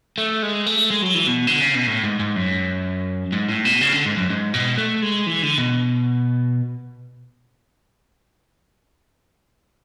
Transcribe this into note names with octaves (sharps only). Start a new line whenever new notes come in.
A3
G#3
A3
G#3
F#3
E3
B2
D3
C#3
B2
A2
G#2
G#2
F#2
G#2
A2
B2
C#3
D3
G#2
F#2
G#2
B2
A3
G#3
E3
D3
B2